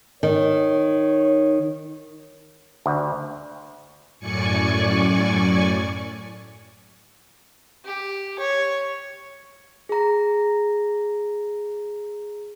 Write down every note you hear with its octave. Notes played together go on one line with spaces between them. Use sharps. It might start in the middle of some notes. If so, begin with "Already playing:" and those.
D#3 C#5
D2
F#2 A2 D5 G#5 C#6 C#7
G4
C#5
G#4 A#5